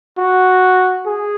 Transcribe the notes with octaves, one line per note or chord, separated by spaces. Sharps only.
F#4
G#4